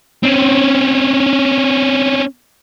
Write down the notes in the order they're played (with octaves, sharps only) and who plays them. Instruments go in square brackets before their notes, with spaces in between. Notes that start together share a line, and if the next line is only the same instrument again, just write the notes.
[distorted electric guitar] C4 C#4